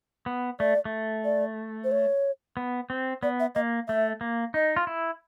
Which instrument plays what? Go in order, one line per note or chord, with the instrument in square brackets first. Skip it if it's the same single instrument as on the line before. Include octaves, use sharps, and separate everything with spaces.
[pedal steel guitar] B3
[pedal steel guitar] A3 [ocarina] D5
[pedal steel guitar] A3
[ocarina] D5
C5
C#5
[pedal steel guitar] B3
C4
[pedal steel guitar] B3 [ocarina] D5
[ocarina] E5
[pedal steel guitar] A#3 [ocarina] D#5
[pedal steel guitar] A3 [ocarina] E5
[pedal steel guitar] A#3
[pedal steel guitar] D#4 [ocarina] D#5
[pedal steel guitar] F4
E4